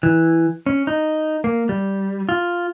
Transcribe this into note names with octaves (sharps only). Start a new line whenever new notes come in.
E3
C#4
D#4
A#3
G3
F4